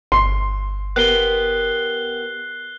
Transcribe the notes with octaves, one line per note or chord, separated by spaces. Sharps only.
G1 C6
B3 G4 A#4 F#6 C7 G7